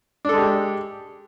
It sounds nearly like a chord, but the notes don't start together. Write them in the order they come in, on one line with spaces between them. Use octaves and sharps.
D4 A4 G#3 G4